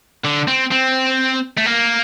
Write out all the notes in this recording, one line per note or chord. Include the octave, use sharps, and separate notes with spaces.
D3
C4
C4
A3
A#3